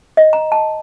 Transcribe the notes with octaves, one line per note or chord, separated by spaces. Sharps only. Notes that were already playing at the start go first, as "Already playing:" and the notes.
D#5
A#5
A5